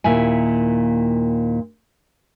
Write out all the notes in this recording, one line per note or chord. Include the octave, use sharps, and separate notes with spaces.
D#2 A#2 E4 G#5